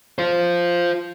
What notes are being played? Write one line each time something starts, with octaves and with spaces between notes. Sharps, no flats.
F4 C5